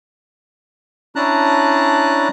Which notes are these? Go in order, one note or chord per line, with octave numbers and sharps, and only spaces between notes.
C#4 D4 E4 A5 A#5 F#6